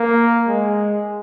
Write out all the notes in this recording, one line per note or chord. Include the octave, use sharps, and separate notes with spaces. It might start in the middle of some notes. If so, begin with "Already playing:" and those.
Already playing: A#3
G#3